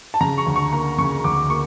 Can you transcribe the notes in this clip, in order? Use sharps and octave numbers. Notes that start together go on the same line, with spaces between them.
A5
C#3 A#5
C#6
D2
C#6
A#3 A#5
C#3 C#6
D2 D6
A#3 C#6